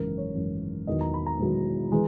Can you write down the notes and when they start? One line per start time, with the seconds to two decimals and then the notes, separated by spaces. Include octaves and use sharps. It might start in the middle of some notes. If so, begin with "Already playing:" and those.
Already playing: G#1 F#2 C#3 E3 A#4
0.18 C#5
0.35 G#1 F#2 C#3 E3
0.87 E1 E2 D#3 F#3 D#5
1.01 A#5
1.14 B5
1.26 A#5
1.40 E1 E2 D#3 F#3
1.92 E3 G#3